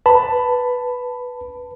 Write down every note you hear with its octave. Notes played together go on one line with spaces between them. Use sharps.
B4 A5 B5